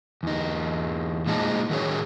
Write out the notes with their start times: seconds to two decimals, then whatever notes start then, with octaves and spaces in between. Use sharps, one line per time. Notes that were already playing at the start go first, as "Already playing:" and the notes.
0.23 E2 D#4
1.26 A#2 G#3 D#4 A5
1.70 D#3 F#3 G#4 C#5